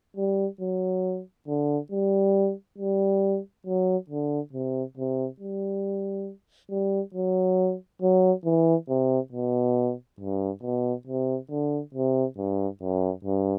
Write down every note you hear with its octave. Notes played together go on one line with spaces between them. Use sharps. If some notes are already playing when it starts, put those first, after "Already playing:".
G3
F#3
D3
G3
G3
F#3
D3
C3
C3
G3
G3
F#3
F#3
E3
C3
B2
G2
B2
C3
D3
C3
G2
F#2
G2